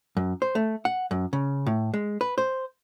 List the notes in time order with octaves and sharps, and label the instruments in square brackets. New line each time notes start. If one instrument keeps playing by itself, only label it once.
[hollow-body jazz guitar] F#2
C5
A3
F#5
F#2
C#3
A2
G#3
B4
C5